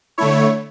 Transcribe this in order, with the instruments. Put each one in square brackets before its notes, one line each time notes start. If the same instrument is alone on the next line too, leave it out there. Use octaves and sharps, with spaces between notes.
[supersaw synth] D3 A3 E4 C#5